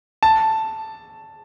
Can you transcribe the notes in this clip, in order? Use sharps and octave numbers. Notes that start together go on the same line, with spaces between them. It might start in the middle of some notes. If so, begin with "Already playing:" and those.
A5